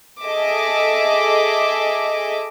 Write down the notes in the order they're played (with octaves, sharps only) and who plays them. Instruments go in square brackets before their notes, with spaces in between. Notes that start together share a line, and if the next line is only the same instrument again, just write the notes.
[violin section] G#4 A4 D#5 E5 D6